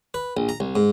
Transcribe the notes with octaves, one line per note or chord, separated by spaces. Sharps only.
B4
A#1
A#5
C2
G#2